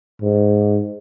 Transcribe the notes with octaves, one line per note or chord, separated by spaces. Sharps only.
G#2